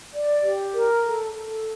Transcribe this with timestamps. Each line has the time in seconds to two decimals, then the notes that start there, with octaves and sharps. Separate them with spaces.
0.14 D5
0.43 G4
0.74 A#4
1.03 A4
1.33 A4